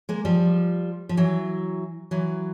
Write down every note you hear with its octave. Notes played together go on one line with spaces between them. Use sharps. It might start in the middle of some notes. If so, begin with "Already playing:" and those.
G#3 A#3
F3 G3
F3
E3 F#3
E3 F#3